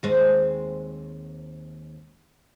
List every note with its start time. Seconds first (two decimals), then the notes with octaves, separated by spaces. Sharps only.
0.03 D#2 G#3 C4